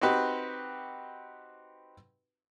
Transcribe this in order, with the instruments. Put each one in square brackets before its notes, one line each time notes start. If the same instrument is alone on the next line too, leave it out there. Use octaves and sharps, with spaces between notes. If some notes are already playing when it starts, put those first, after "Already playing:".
[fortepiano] C4 D#4 F#4 G4 B4